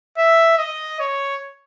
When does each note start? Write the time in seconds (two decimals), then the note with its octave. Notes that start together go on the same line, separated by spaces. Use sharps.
0.18 E5
0.58 D#5
1.00 C#5